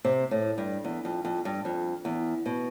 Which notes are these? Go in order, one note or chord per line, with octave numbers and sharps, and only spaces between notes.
C3
A2
G2
E2
F2
F2
G2
F2
E2
B2